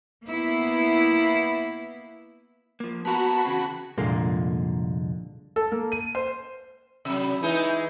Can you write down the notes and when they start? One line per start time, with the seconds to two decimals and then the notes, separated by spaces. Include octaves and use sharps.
0.24 A#3 B3 E4
2.80 F3 A#3
3.05 B3 F#4 A#4 A5 B5
3.45 E2 C#3 C4
3.98 C2 F2 A#2 D3 G#3 A#3
5.56 A4
5.72 A#3
5.92 D#7
6.15 C5
7.05 C3 F#3 E5 B5
7.42 E3 G#3 D#4